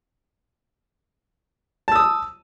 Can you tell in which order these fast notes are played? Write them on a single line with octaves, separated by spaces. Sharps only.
A5 E6 D#6